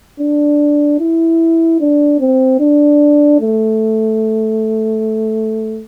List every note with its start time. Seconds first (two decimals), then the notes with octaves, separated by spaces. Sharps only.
0.20 D4
0.99 E4
1.80 D4
2.20 C4
2.60 D4
3.40 A3